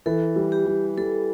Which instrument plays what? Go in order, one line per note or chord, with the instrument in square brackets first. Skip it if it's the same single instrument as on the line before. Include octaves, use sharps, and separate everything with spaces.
[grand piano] E3 [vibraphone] A4
[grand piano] G3
[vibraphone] G4
[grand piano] G3
[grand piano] G3 [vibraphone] A4